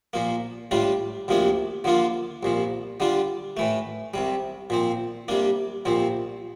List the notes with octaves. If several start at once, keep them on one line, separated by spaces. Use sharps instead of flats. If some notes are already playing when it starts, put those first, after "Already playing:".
A#2 F3 A#3
A2 G3 D4 F4
D2 C3 F3 A#3 D4
D3 F3 A#3 D4 F4
C2 A#2 F3
D3 G3 D4 F4
A2 E3 A3
C2 C3 G3
A#2 F3 C4
C3 G3 A#3 D4
C2 A#2 F3 C4